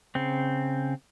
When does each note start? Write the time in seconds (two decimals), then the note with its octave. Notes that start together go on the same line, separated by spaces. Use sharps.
0.15 C#3 C4